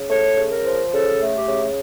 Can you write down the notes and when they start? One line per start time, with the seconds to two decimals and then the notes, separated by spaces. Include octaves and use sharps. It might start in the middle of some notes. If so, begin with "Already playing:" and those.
Already playing: C#3
0.10 A3 C#5
0.37 C#3
0.52 A#4
0.65 F3
0.92 C#3 A4
1.20 A3
1.34 G4
1.48 C#3